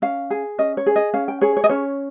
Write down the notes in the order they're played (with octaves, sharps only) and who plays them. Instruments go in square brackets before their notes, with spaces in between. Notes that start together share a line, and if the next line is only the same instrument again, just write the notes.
[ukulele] C#4 F5
G#4
C#4 D#5
C#5
G#4
D#5
C#4 F5
G5
G#4 C#5
C#5
D#5
C#4 C#5